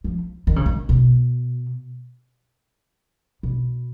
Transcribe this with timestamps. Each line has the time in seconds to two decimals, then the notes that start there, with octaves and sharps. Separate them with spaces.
0.04 F3
0.47 D#3
0.56 C#3
0.66 D#3
0.89 B2
3.43 B2